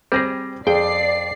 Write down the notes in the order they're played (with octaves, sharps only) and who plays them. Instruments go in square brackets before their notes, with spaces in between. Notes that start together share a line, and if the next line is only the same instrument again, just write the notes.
[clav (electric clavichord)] G3 G#4 [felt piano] C4 A#6
[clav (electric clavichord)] F2 G5 [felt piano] G#4 [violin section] D5 C7